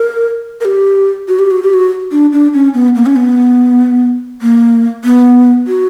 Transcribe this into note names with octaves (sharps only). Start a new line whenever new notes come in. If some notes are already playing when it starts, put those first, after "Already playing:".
Already playing: A#4
A#4
G4
F#4
G4
F#4
G4
F#4
D4
D4
C#4
B3
A#3
C#4
B3
A#3
B3
F#4